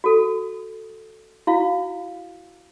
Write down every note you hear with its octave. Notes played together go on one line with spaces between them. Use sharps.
F#4 A4
E4 F#4 F5